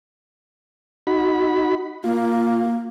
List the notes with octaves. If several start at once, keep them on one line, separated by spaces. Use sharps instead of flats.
D#4 F#4 B5
A#3 F4